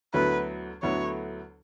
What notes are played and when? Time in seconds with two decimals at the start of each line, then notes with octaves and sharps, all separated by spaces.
0.13 D2 D3 F#3 B3 E4 B4
0.82 D2 D3 F#3 B3 E4 C#5